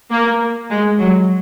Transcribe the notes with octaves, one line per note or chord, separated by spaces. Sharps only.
A#3
G#3
F#3